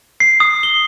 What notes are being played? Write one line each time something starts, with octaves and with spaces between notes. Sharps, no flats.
C7
D#6
G7